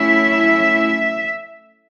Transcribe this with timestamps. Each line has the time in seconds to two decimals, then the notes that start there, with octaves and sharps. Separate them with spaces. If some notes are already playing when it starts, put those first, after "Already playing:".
Already playing: F#3 A3 C#4 E4 E5